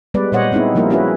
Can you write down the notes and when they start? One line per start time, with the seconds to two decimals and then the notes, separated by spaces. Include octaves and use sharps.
0.14 G3 G#3 B3 B4 D5
0.32 A#2 G3 C5 C#5 D#5 F#5
0.52 G#3 B3 C4 D#4 E4
0.75 F3 G3 A#3 E4 A#4
0.90 C#4 E4 F#4 G#4 B4